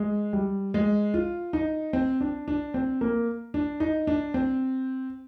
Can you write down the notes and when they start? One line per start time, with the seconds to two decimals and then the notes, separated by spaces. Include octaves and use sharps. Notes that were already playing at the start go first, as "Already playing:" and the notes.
Already playing: G#3
0.33 G3
0.74 G#3
1.14 F4
1.53 D#4
1.93 C4
2.21 D4
2.48 D4
2.74 C4
3.01 A#3
3.54 D4
3.80 D#4
4.07 D4
4.34 C4